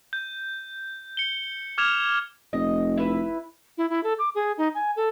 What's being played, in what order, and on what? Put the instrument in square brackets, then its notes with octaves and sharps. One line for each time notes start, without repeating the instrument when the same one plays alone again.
[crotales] G6
C#7 G7
D6 F6 G#6 E7 F7
[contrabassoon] F1 [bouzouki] D#5
[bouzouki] E4 B4
[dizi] E4
E4
A4
D6
G#4
D#4
G#5
A4